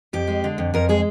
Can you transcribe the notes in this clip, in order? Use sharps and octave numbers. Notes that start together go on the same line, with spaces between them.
F2 G4
G#3
D3
F2
F2 A#4
G#3 G#4